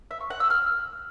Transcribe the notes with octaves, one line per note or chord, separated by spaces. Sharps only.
E5
C#6
F#5
E6
F6